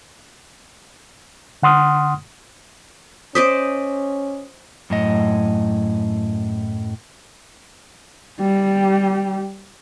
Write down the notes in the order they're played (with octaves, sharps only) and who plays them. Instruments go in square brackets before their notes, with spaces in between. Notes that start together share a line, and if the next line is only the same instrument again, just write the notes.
[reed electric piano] D3 F#5 C6 D#6 F6
[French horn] C#4 [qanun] C5 D5 D#5 [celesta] D#6 B6
[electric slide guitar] F#2 A2 D#5
[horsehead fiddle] G3 G4